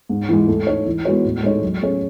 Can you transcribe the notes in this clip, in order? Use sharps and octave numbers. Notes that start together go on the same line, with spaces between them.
G#2
E3 G#3
A3
D#4 A4 C#5
E3
G#3 B3 F#4 C#5
A2
G#3 D#4 A4 C#5
F#3
A3 C#4 G#4 C#5